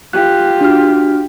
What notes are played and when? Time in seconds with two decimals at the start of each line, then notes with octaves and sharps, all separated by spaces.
0.13 F4 G4 F#6
0.61 D4 F#4 F6